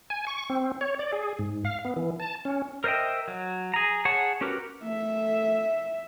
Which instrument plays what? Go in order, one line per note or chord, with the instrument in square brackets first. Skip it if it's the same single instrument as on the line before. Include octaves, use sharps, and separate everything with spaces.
[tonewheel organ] G#5
C#6
C4
C#5
D5
G#4
G#2
F5
B3
E3
A5
C#4
[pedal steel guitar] A#4 C5 D#5 E5 G5
F#3
G#4 A#5
G#4 C#5 F#5 A5 C#6
C#4 F#4 G4 A#4 B4
[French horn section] A3 [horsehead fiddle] E5